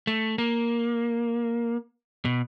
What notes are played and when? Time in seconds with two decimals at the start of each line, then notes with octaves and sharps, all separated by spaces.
0.07 A3
0.38 A#3
2.25 B2